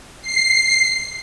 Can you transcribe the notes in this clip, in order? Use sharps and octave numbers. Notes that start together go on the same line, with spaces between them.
C7